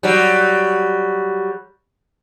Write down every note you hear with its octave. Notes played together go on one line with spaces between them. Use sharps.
F#3 G3